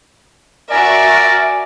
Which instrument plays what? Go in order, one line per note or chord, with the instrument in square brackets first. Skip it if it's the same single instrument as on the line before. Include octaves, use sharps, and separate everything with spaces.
[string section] F#4 E5 [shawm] A#4 [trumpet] D5 [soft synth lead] G#5